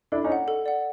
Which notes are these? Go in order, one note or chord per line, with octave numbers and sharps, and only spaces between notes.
D4 E4 A4
C#4 D#4
D5 F#5
A4
D5 F#5